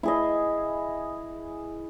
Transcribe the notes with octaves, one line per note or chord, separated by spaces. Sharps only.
E4 G#4 D#5